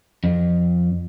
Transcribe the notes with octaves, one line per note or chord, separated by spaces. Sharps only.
F2